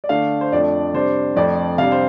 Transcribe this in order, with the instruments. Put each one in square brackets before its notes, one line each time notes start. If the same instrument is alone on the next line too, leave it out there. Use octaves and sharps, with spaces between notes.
[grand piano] D5
D3 A3 D4 F5
C5
F2 F3 A3 D4 D5
C3 G3 D4 C5
F2 F3 A3 C4 D5
C3 G3 D4 F5
C5